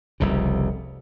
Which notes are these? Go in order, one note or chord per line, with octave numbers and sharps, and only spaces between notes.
F1 C2 C#3